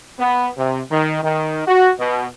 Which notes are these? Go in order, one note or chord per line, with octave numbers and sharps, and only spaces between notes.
B3
C3
D#3
D#3
F#4
B2